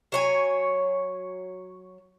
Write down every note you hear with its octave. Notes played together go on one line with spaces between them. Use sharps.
F#3 C#5 G#5